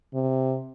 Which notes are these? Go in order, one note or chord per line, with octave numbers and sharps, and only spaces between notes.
C3